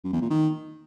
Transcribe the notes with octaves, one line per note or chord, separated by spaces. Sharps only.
F#2
E2
A#2
D#3